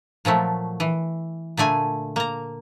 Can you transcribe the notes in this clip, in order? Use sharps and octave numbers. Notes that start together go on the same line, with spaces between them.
A#2 F3 F#3 A3
E3
A#2 D3 A3 G#5
A#3 A#5